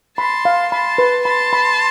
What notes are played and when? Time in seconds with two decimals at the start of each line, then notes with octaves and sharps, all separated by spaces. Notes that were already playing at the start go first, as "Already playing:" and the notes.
0.18 A5 B5 C6
0.45 F5
0.72 A5 B5 C6
0.98 B4
1.25 A5 B5 C6
1.53 B5